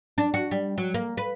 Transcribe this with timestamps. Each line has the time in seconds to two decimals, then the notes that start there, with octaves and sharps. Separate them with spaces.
0.18 D4
0.34 F#4
0.51 G3
0.78 F#3
0.94 A#3
1.17 B4